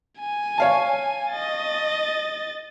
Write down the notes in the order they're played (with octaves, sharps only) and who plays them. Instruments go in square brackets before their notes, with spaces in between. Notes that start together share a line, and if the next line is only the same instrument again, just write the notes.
[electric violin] G#5
[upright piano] C#5 F5 A5
[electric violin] D#5 A6